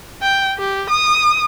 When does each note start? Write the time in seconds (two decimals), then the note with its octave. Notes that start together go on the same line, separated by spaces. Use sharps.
0.22 G5
0.59 G4
0.90 D#6